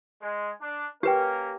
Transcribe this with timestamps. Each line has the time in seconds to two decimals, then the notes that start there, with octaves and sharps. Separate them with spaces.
0.22 G#3
0.62 D4
1.03 A#3 C#4 G4 A#4 B4 G5